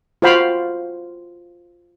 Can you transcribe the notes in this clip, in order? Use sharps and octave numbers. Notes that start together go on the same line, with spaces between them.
F4 F#4 C5 F5 G5 B5